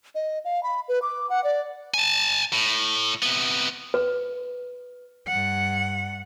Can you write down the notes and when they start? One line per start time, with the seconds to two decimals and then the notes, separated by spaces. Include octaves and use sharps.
0.15 D#5
0.45 F5
0.63 B5
0.88 B4
1.02 D6
1.30 F#5
1.44 D5
1.94 G#5 A5
2.53 A2
3.23 C3 B3
3.94 B4
5.28 G2 F#5